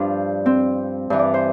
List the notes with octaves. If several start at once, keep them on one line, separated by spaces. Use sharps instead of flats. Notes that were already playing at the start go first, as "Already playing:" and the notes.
Already playing: G2 F3 D4
C4
G2 E3
D5
C5